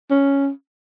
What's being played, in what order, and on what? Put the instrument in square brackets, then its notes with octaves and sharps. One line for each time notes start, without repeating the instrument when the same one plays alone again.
[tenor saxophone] C#4